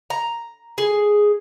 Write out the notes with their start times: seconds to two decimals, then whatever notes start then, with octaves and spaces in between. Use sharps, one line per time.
0.10 A#5
0.78 G#4